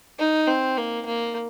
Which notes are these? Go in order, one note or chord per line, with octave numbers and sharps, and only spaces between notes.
D#4
C4
A#3
A#3